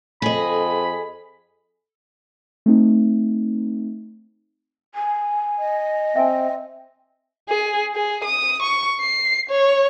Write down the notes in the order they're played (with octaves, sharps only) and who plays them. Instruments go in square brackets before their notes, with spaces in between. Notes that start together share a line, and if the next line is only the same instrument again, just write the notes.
[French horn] F2 [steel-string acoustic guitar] G#4 D#5 [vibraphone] A4 [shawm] B5
[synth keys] A3 C4 D#4
[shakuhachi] G#5
[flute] D#5
[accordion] C4 [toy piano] E5 G#5
[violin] G#4
G#4
D#6
C#6
C7
C#5